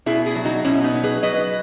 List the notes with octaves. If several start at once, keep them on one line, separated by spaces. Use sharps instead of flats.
B2 E4 G#4
E4 G#4
F#3
D#4 F#4
B2 C#4 E4
B3 D#4
F#3
G#4 B4
F#3 B4 D#5